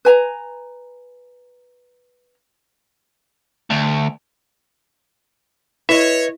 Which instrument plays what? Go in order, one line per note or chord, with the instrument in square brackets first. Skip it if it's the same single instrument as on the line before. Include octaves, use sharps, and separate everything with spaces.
[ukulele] B4 G#5 A#5
[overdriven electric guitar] D2
[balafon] E4 [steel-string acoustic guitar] B4 D#5 [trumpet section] C#5 [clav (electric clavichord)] E5